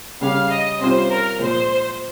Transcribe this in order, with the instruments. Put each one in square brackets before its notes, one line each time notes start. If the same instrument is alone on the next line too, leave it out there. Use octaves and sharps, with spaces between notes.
[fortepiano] C#3 G3 C#4 G4 [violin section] F5
[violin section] D#5
[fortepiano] C3 G3 C#4 F4 [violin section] C5
[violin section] A#4
[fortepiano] A#2 F3 G#3 [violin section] C5